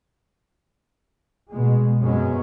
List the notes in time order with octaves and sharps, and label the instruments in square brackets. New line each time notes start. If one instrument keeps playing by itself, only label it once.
[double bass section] B2 G#3
F#2 C3 F#3 G#3 B3 C#4